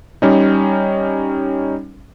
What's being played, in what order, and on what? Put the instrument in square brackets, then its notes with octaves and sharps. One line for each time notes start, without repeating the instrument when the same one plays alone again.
[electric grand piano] G3 C#4 D#4